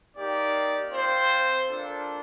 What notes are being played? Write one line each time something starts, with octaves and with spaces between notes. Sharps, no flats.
A#3 D#4 G4 D5
C4 F4 C5
A#3 D4 F4 A4